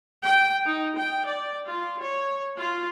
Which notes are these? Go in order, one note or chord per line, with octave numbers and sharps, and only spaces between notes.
G5
D#4
G5
D5
F4
C#5
F4